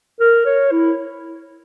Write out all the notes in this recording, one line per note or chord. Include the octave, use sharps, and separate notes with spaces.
A#4
C#5
E4